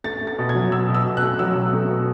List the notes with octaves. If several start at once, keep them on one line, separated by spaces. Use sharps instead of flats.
A3 A6
A3
A6
B2
G#6
F#3
B2 E6
B2
E6
B2
F#6
A3
F#3 E6
B2
A3
B2